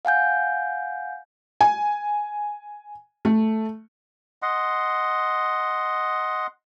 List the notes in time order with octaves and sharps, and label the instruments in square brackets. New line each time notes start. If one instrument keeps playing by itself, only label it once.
[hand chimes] F5 F#5 G#5 G6
[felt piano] G#5
A3
[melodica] D#5 F#5 C6